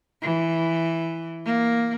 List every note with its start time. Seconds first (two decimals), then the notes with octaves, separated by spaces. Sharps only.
0.22 E3
1.45 A#3